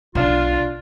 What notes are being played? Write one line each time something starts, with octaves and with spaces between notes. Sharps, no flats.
B1 D4 F4